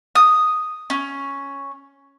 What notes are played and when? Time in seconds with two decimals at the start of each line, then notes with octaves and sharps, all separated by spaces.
0.15 D#6
0.90 C#4